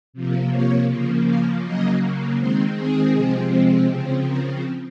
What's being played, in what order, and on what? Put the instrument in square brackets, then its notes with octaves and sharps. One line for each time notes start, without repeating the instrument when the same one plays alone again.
[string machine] C3 F3 A#3
C#5
C#3 F3 A#3
F5
C#3 F#3 A#3 D#5
D#3 G#3 C4 C5
G#4
C3 F3 G#3 C4
C#3 F3 C4
A#4